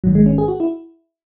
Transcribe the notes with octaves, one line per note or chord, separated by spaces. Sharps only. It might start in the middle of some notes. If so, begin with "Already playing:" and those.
A1 G#2 D#3 F#3
G#3
C#4
G#4
F#4
E4